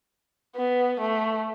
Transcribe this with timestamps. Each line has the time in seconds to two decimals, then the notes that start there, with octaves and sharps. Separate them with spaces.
0.56 B3
1.00 A3